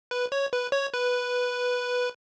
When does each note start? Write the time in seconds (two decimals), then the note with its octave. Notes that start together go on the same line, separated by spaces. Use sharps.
0.11 B4
0.32 C#5
0.53 B4
0.72 C#5
0.94 B4